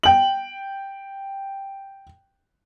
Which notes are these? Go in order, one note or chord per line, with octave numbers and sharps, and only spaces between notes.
G5 F#7